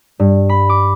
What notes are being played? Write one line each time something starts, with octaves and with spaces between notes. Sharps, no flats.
G2
B5
D6